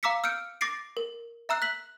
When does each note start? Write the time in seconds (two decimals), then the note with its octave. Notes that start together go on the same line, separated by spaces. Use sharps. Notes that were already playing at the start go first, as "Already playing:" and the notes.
0.03 F5 A#5 D6 E6 B6 C#7
0.24 E6 F6 G6 C#7 D7
0.61 D6 A6 A#6 C7 D7
0.97 A#4
1.49 E5 A#5 E6 F#6 C7
1.62 F#6 B6 F#7